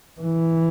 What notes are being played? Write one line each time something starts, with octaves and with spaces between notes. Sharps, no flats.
E3